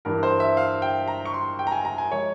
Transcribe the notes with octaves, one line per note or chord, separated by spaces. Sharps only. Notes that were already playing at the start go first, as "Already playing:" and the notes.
G2 E3 G3 A#4
C5
E5
F5
G5
A#5
C#6
C6
G5
A#5
G#5
A#5
G#5
F3 G#3 C#5